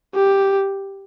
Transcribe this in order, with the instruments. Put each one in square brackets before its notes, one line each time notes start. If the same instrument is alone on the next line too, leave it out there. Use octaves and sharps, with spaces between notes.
[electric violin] G4